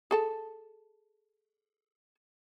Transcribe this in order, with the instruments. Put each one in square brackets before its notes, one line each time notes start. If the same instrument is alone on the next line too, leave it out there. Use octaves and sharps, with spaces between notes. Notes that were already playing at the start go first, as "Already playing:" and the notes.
[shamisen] G#4 A4 A5